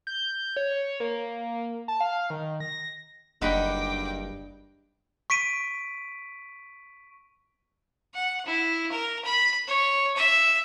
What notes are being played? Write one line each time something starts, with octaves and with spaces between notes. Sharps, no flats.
G6
C#5
A#3
A5
F5
D#3
A#6
F#1 G2 D#4 F#5 G5 B5 D6
C#6 B6 D7 D#7
F#5
E4
A#4
B5
C#5
E5